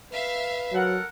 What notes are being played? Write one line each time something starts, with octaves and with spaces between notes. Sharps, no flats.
B4 E5 F5
F#3 A4 A#4 F#5